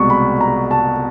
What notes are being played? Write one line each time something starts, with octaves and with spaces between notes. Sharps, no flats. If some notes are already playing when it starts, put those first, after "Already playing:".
Already playing: C2 B2 G#3 C#6
B5
A#5
A5